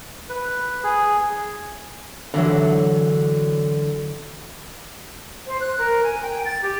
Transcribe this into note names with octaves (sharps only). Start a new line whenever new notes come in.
B4
G#4
D3 E3 F#3
C5
F#6
A#4
G#5
G5
A6
G4